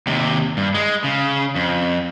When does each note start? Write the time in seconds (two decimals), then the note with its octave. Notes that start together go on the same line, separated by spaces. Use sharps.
0.07 D#2 C3
0.57 G2
0.74 G#3
1.04 C#3
1.55 F2